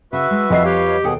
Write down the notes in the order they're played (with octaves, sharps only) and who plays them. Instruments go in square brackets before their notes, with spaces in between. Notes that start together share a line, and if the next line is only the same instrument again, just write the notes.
[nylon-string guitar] C#3 [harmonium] F#4 B4 E5
[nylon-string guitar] G#3
[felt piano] F2 D#5 C7 [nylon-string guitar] F3 C5
[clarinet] G4 [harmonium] B4 C#5 F5
[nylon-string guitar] D#2 A4 G5 [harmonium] B2 G#4